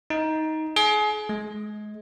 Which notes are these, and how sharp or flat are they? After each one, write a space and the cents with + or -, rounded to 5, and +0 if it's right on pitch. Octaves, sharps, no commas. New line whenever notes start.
D#4 +15
G#4 +30
G#3 +30